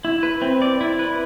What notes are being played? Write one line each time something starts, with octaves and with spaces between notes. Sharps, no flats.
E4
B4
C4
D5
E4
B4